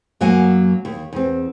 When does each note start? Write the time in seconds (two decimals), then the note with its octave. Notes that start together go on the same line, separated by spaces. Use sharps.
0.21 F#2 F#3 A#3 F#5 G#5
0.85 D#2
1.13 E2 C4